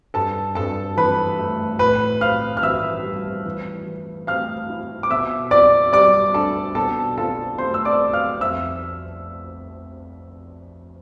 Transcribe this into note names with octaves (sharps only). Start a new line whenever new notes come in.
G2 A4 A5
G2 A4 A5
E3 B4 B5
A3
A2 B4 B5
C4 F5 F6
F6
E3 E5 E6
G3
E3
E3
A3 F5 F6
E4
D6
B2 E5 E6
F4 D5 D6
G3 D5 D6
D4 A4 A5
B2 A4 A5
F4 A4 A5
A3 C5 C6
E6
D5 D6
C4
F5 F6
F2 E5 E6